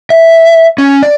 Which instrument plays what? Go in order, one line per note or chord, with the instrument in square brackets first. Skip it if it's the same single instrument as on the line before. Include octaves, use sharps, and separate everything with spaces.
[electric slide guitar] E5
C#4
D5